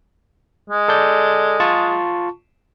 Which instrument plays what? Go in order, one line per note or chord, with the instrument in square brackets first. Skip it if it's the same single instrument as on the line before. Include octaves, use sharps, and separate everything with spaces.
[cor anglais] G#3
[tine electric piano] A4 D5 G6
F4 A5 C#6